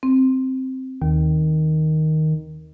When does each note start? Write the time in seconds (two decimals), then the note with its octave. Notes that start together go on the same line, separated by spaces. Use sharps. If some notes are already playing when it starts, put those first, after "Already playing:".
0.03 C4
1.02 D#2 D#3